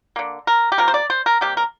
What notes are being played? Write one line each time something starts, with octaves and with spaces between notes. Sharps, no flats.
D3 A#3
A#4
G4
C3 F3 A#3 A#4
C5
D5
C5
A#4
C3 G3 A#3 G4
A#4